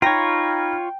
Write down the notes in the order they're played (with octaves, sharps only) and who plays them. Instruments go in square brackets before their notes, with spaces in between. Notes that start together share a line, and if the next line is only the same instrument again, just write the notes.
[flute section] D#4 B5 F6 [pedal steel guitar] F4 C#5 [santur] G5 [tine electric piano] A#5 A#6